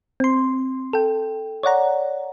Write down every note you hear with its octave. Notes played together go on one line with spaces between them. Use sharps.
C4 C6
A4 G5
C#5 D5 F#5 A#5